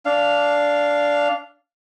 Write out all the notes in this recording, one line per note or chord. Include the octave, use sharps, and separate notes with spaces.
D4 F5